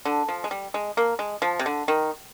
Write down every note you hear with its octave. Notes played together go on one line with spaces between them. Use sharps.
D3
F3
G#3
G3
G#3
A#3
G#3
F3
C3
D3
D#3